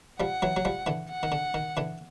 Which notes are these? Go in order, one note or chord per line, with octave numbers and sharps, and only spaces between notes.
F3 G3 F#5
E3 F#3
F#3
F3 G3
D3 E3
F#5
D#3
D3
D#3
D3 E3